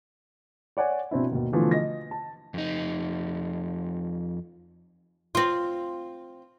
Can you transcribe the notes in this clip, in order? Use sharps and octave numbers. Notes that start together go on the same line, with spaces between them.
C#5 D5 F#5 G#5
B2 C4 D4 E4
D#2 B2
B2 D3 E3 F3 A3
D#5 A#6
A5
F2 D#4
C4 F4